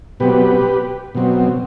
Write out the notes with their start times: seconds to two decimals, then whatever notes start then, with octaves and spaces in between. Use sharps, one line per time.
0.20 B2 F#3 C4 G4 B4
1.15 B2 F#3 C4